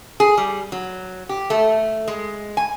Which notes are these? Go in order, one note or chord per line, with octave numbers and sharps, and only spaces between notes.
G#4
G3
F#3
G4
A3
G#3
G#5